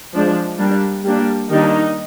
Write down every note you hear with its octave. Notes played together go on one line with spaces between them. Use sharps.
F3 G#3 D4
G3 A#3 D4
G3 A#3 D4
D#3 G3 A#3 D4 D#4